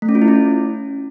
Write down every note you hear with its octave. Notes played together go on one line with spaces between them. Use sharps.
A3
C#4
F4
E4
C#4